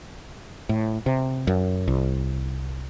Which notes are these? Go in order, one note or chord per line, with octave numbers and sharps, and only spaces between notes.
A2
C3
F#2
C2